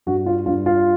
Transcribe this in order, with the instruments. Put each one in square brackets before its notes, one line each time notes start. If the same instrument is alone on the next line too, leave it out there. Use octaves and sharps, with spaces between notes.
[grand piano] G2 F#4
F4
G2 F4
F4